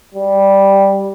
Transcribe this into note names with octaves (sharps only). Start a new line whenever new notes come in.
G3